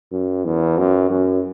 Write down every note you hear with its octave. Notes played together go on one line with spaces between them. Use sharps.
F#2
E2
F#2
F#2